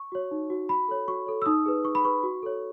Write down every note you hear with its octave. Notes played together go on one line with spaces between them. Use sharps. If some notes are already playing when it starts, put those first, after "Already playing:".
Already playing: C#6
F#4 C#5
D#4
F#4 C#5
F#4 B5
A4 C#5
F#4 C#6
A4 C#5
E6
D#4 D#6
G#4 B4
D#4 C#6
B5
G#4 B4 C#6
F#4
A4 C#5